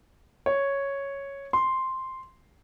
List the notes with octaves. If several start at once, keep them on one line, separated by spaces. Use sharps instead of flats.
C#5
C6